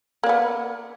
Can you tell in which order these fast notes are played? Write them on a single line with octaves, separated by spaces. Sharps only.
A#3 D5 B3